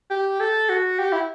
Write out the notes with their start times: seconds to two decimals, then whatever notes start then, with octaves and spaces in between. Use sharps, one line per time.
0.11 G4
0.40 A4
0.69 F#4
0.99 G4
1.13 E4